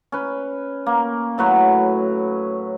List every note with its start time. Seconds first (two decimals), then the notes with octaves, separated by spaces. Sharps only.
0.12 C#4 B4
0.86 A#3
1.38 A2 F#3 B4 C#5